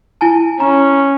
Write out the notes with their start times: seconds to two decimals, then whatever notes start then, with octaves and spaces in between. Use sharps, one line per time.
0.21 E4 G#5 A5
0.60 C#4 A#5